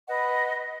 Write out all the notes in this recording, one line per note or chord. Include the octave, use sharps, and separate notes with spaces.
B4 D#5 F#5